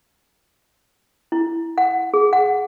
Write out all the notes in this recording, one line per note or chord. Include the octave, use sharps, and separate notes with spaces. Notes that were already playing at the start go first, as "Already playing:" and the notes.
E4
F#5
G#4
F#5